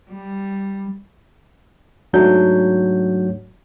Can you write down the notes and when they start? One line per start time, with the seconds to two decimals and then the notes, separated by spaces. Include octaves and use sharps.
0.10 G3
2.13 G#2 F#3 A3 D4 G6